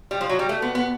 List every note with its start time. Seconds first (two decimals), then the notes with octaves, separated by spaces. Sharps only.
0.11 G3
0.21 F3
0.29 F#3
0.39 G3
0.49 A3
0.62 B3
0.75 B3